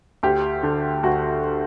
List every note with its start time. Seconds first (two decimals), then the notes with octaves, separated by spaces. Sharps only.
0.23 D2 G4
0.63 D3
1.03 D2 F#4